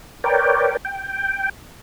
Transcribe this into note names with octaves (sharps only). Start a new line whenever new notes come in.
A#4 B4 C#5 D5 G5
G5